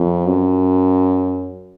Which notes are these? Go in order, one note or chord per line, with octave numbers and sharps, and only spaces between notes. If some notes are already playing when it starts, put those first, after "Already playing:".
Already playing: F2
F#2